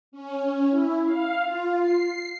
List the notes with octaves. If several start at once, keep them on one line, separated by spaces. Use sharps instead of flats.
C#4
E4
F5
F4
C7